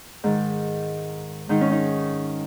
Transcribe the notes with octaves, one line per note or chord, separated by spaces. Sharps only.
G#2 D#3
G#2 D#3 D#4
C#4
D#4